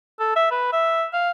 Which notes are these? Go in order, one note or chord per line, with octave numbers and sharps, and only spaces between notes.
A4
E5
B4
E5
F5